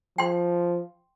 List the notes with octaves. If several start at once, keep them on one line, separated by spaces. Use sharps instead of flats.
F3 G5 C6